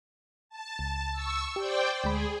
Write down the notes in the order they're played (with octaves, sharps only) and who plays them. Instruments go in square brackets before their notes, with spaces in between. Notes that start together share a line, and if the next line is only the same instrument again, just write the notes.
[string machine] A5
[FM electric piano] C#2
[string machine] C#6 E6
[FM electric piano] G4 [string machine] C5 D5 G5
[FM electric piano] D2 G#3 B5 [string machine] G#4